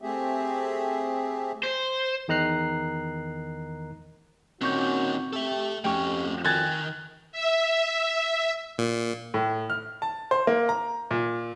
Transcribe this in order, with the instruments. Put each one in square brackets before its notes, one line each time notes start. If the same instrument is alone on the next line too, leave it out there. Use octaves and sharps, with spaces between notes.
[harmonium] A3 C4 G4 G#4 E5
[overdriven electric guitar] C5
[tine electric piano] E2 D#3 D#4 A#5 F#6 C7
[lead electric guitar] A#2 D#3 [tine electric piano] C4 C#6 G6 [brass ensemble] C#4 F#4
[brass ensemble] G4 [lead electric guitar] A4 E5
[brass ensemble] F2 [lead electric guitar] F3 C#4 [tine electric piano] A3 G4 C#6 [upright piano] G5
[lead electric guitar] D#3 [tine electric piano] G#5 [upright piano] F#6 G#6 A6
[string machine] E5
[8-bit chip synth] A#2
[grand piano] A2
F6
A5
C5
A#3
A#5
A#2